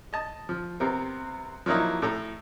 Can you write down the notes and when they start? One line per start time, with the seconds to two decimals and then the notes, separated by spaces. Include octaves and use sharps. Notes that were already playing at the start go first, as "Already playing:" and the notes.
0.13 D#5 A5
0.49 F3
0.80 C3 B3 C4 A#4
1.66 F3 F#3 A#3 D#4 E4
2.02 A2 A4 A#5